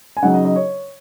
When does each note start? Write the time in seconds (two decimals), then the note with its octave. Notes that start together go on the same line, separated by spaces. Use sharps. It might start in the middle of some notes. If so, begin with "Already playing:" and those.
0.17 G#5
0.22 C#3 F#3 D#4 F#5
0.34 D#5
0.45 D#5
0.56 C#5